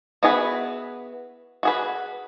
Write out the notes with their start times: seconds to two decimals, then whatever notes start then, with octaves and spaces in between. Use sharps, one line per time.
0.23 B3 E4 F#4 G#4 B4
1.63 F#4 G#4 B4